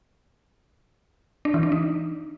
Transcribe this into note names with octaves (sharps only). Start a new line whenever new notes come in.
D4
E3
D4
D#4